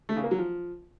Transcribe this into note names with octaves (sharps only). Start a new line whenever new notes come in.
A3
C#3
A#3
F#3
F3